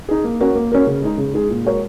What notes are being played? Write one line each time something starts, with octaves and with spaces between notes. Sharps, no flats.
D#4 G#4
A#3
C#4 F#4 A#4
A#3
C#4 F#4 A#4
C#3
G#3 D#4 G#4
C#3
G#3 D#4 G#4
A#2
G#3 F#4 A#4 C#5